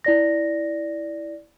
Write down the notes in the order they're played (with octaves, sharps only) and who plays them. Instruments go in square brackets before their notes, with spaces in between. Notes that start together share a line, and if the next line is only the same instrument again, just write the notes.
[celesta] E4 D5 A#6